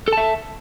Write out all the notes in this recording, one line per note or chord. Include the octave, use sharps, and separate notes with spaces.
A4 E5 A5